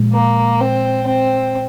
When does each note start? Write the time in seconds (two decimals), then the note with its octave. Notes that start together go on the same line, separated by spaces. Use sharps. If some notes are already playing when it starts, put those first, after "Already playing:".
Already playing: A#2 F3 G#3
0.13 A#3
0.61 C4
1.07 C4